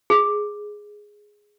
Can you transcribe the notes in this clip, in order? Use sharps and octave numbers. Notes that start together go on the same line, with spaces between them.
G#4